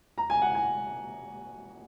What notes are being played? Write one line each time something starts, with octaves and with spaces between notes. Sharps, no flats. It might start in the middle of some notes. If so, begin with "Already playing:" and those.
A#5
G#5
F#5
G#5